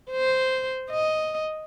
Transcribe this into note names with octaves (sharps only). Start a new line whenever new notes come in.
C5
D#5